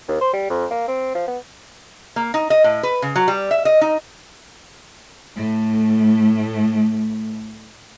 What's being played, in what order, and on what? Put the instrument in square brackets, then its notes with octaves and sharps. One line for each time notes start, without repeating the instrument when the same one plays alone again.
[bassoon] D#2
C5
G3
F2
A#3
C4
F3
B3
[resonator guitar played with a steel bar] A#3
D#4
D#5
A2
B4
C#3
F#3
G3
E5
D#5
D#4
[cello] A2 A3